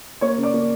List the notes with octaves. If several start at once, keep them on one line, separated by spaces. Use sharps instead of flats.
A#3 C#5 C#6
C#3
D5 D6
A#3